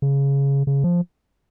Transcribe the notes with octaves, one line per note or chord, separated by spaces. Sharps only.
C#3
C#3
F3